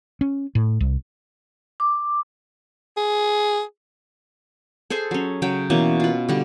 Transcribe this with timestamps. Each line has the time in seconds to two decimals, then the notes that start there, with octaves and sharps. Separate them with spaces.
0.21 C#4
0.55 A2
0.81 C2
1.80 D6
2.97 G#4
4.90 G#4 A4 C5 G#5
5.11 F#3 C#4
5.42 C#3 F#3 G5
5.70 B2 E3 A#3 C#4
6.00 F4 B4
6.29 D3 G3